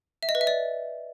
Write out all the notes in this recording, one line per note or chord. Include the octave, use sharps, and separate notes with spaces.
E5
D#5
B4
E5
D5